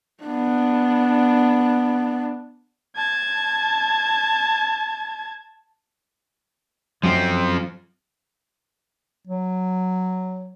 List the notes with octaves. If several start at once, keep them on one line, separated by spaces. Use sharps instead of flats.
B3 D4
A5 G#6
F#2 F3 C4
F#3